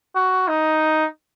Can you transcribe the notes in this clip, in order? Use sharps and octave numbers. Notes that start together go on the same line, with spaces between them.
F#4
D#4